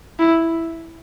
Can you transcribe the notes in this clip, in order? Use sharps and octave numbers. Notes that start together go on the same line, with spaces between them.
E4